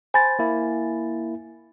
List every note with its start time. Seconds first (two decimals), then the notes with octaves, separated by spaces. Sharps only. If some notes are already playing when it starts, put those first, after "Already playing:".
0.14 C5 G#5 B5 A6
0.39 A#3 E4